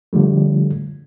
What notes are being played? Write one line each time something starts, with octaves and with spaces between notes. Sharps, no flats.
D3 F3 G3 A3